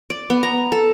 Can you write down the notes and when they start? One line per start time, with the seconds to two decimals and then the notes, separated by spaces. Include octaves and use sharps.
0.10 D5
0.30 B3
0.43 A#5
0.72 A4